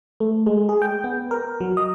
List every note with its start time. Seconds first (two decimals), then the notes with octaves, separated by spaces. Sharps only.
0.20 A3
0.46 G#3
0.69 G#4
0.82 G5
1.04 B3
1.31 A#4
1.61 F#3
1.77 D#5